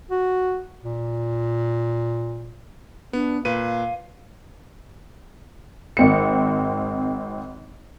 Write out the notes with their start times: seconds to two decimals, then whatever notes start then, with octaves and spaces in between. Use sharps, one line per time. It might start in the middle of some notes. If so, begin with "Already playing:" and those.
0.11 F#4
0.83 A#2
3.13 B3 D4
3.45 A#2 B4 F5 D#7
5.97 G#1 C4 C#7